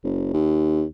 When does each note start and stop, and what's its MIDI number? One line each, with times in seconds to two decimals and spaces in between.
0.04 0.31 30
0.33 0.84 39